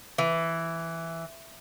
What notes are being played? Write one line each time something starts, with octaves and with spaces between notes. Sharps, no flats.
E3